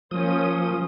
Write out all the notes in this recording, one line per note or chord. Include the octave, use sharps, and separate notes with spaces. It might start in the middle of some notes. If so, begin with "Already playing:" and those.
F3 A#3 C#4 C5 D#6